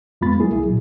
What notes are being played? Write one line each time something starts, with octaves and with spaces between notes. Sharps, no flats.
F2 G#3 B3 F4 B5 A6
F#3 G3 A#3 E4 G#4
C2 E4 G#4
A#2 F#3